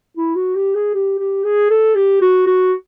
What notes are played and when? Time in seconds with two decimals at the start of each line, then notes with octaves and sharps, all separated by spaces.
0.17 E4
0.36 F#4
0.56 G4
0.75 G#4
0.94 G4
1.19 G4
1.44 G#4
1.70 A4
1.95 G4
2.21 F#4
2.47 F#4